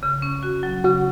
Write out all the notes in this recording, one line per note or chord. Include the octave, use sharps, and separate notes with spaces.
C#3
C#4
F#4
F#3
C#3 F#4